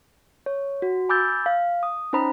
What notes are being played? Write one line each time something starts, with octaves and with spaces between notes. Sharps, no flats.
C#5
F#4
G#5 B5 D6 E6 G6 A6
F5
D#6
C#4 D#4 C5 A#5 B5